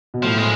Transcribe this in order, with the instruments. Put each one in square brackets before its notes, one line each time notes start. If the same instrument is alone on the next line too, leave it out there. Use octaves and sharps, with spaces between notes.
[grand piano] B2
[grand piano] A2 [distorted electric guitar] F3
[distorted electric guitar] G#3